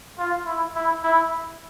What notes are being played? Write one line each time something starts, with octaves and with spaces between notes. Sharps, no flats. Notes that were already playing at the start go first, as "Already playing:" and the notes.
F4
E4
E4
E4